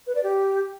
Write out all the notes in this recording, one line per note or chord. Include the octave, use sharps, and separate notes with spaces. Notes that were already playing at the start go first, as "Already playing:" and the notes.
B4
D5
G4